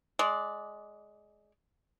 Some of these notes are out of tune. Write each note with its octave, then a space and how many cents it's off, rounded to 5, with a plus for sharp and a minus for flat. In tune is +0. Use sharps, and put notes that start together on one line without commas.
G#3 +15 D5 +0